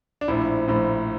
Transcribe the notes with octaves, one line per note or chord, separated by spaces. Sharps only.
D4
A#1 A2 F3 E4
A#1 A2 F3